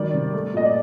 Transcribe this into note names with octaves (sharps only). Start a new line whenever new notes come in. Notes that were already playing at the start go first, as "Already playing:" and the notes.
Already playing: D#3 F#3 G3 D5
C3
A3
A#2 D#5
D5